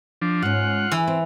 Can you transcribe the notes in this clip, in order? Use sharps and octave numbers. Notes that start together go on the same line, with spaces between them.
F3 D4
G#2 C#4 F4 F#5
E3
C4